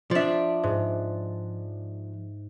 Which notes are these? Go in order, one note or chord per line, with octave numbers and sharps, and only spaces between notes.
F3 D4 D5 E5
G#2